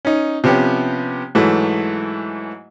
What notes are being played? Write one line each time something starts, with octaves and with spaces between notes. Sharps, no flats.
C#4 D#4
C3 F3 B3 C#4 G4
G#2 E3 F#3 A3